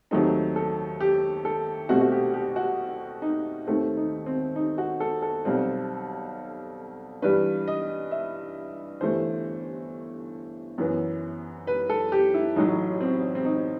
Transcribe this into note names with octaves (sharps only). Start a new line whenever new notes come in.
D#2 D#3 F#3 A3 C4 D#4
A4
G4
A4
C2 B2 A3 C4 F#4
F#4
G4
G4
F#4
D#4
D#2 D#3 A3 C4
D#4
C4
D#4
F#4
A4
A4
B1 B2 G3 C4
G2 E3 G3 B4
D#5
E5
G1 G2 E3 A3 C5
F#2 E3 B3
B4
A4
G4
E4
A1 A2 F#3 D#4
C4
C4
D#4